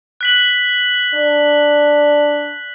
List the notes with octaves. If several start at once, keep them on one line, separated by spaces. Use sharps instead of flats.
F#6 B6 F#7
D4